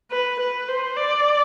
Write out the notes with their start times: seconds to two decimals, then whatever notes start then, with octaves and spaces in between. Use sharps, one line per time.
0.11 B4
0.40 B4
0.68 C5
0.97 D5